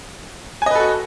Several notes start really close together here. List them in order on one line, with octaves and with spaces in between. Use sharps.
G#5 D#5 B4 A4 F#4